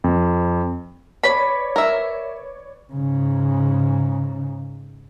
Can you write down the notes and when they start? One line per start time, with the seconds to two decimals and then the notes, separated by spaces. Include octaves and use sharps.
0.04 F2
1.24 B4 C#5 D5 B5
1.76 A#4 E5
2.93 G#2 C#3